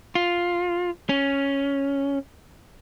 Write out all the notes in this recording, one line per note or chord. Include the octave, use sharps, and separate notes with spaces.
F4
C#4